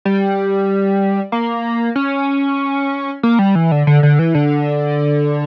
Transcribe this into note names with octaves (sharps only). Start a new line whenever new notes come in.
G3
A#3
C#4
A#3
G3
E3
D3
D3
D3
E3
D3